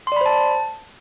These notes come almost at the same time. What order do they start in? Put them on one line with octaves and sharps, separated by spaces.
C6 D5 B5 C5 A5